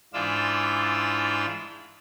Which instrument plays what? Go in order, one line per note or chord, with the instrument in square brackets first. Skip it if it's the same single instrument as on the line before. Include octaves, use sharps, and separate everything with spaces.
[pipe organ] G#2 E3 D4 F4 D5 E6